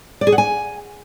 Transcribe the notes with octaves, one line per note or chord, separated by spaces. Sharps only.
D5
G#4
F#5
G#5